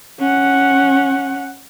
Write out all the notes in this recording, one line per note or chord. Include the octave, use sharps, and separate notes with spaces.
C#4 F#5